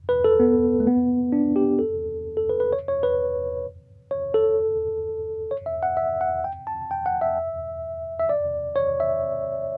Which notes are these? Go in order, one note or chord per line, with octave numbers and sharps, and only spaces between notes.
B4
A4
B3
A3
B3
D4
G4
A4
A4
B4
B4
C#5
C#5
B4
C#5
A4
C#5
E5
F#5
E5
F#5
G5
A5
G5
F#5
E5
E5
D5
C#5
E5